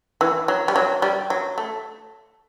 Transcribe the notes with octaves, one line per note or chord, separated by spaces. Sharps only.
E3
F#3
G3
F#3
G3
F#3
A3